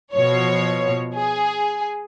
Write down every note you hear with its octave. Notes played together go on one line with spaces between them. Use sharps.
B2 F3 C#5
G#4